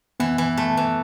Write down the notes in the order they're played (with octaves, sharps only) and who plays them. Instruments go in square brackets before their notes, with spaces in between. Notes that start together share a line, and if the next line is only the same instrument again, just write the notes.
[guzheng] E3 [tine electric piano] B3
[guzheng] E3
A3
E3